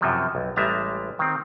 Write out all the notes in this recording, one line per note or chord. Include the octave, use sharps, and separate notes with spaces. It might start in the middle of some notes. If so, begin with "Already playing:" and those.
F#2 C3 F3 F#3
B1
A1 G3 G#3 E5 A5 A#5
D#3 C4